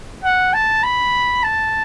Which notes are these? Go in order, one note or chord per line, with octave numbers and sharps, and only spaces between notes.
F#5
A5
B5
A5